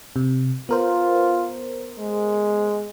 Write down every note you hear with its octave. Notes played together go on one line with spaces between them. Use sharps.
C3
B3 F4 A#4 C5
G#3